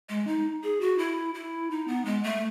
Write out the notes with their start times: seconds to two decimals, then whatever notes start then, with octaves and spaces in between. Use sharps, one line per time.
0.09 G#3
0.27 D#4
0.63 G#4
0.81 F#4
0.98 E4
1.34 E4
1.71 D#4
1.88 B3
2.05 G#3
2.24 A3